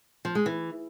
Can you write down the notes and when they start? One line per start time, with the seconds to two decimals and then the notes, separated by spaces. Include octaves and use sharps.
0.25 F3
0.35 G#3
0.46 E3